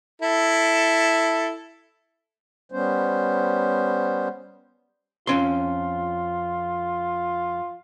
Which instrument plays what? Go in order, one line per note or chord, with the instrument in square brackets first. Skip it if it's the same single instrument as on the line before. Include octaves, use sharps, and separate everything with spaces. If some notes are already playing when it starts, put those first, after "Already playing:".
[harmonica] E4 A4
[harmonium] G3 B3 C#4 C5
[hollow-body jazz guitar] F2 C#4 C6 [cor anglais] F4